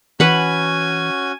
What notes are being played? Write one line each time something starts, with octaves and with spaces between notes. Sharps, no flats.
E3 C#4 F#4 B4 F#5 G#5 B5